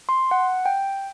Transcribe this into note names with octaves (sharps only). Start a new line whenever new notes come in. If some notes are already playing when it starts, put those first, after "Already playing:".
C6
F#5
G5